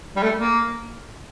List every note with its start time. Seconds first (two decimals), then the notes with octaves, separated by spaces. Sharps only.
0.16 G3
0.23 A3
0.37 A#3